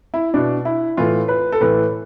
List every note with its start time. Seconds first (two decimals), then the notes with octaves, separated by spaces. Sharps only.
0.14 E4
0.34 B2 D4
0.65 E4
0.97 A2 E3 F4
1.28 B4
1.52 A4
1.61 A2 E3 B4